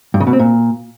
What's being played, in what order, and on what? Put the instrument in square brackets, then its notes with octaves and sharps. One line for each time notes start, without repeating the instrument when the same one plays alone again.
[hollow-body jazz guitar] G2
C#3
B2
C4
A#2